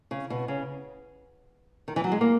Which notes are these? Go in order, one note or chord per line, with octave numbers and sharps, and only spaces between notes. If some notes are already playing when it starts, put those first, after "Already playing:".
C#3
B2
C#3
D#3
E3
F#3
G#3
A#3